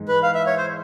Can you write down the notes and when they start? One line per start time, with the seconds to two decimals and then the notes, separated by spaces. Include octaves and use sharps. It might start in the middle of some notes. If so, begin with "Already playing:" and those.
Already playing: G#2 E3 G#3
0.08 B4
0.23 F5
0.35 E5
0.47 C#5
0.58 C5